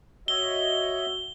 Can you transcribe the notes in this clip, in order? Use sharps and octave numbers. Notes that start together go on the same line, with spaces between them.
F#4 C#5 D#5 E5 G7